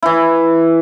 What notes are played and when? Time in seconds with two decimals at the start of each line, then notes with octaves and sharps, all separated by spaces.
0.03 E3 E4